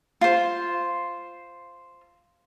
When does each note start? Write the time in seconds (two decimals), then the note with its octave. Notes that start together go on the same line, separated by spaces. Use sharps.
0.21 F4 C5